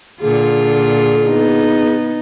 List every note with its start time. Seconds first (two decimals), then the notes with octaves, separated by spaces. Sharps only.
0.21 A#2 D3 F4 G#4
1.28 B3 D#4